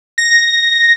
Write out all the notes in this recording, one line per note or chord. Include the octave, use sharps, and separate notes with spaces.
A#6